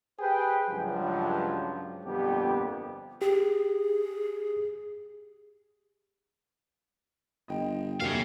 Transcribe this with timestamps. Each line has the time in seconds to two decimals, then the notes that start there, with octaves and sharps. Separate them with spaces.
0.20 G4 G#4 B4 C5 G5
0.70 C#2 G2 F3 F#3
2.06 G1 F2 A#2 B3 G4
3.22 G4 G#4
7.48 G1 D#5 G5
8.01 E2 C3 F#3 A3 A#3 G#4 F5